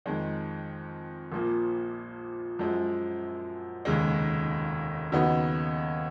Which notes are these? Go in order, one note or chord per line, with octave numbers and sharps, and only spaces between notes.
F2 D#3 G#3
A#1 A#2 F3 A#3
F#2 F3 G#3
F1 D#2 C#3 G#3
D#2 C#3 F#3 B3 D#4